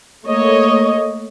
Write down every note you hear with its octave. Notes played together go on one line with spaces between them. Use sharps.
A3 A#3 C#5 D#5